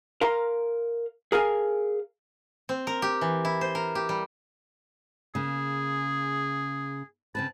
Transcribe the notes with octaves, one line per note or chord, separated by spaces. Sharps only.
A#4 F5 A#5 C6
G#4 A#4 F5 G#5
C4
A#4
G4
E3
E4
C5
A#4
G4
G3
C#3 A#3 G#4
C#3 C4 B4 A5